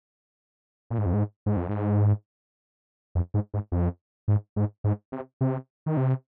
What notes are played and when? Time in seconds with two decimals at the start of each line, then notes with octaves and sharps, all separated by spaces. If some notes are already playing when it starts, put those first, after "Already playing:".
0.90 A#2
0.98 G#2
1.06 F2
1.13 G#2
1.46 G#2
1.57 F2
1.69 G#2
3.15 F2
3.34 G#2
3.54 G#2
3.72 F2
4.28 G#2
4.56 G#2
4.84 G#2
5.12 C3
5.41 C3
5.86 D#3
5.97 C3